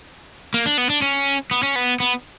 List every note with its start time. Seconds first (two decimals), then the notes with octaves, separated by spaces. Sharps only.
0.54 A#3
0.66 D4
0.78 B3
0.90 D4
1.02 C#4
1.51 B3
1.63 C#4
1.76 B3
2.00 B3